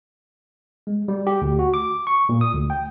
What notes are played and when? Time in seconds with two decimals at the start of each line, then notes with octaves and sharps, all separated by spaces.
0.87 G#3
1.08 G3
1.27 G4
1.42 D2
1.59 F#4
1.74 D6
2.07 C#6
2.29 A#2
2.41 D#6
2.54 D2
2.70 G5